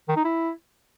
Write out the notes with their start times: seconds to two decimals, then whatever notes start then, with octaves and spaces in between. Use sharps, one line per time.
0.08 D#3
0.16 D#4
0.24 E4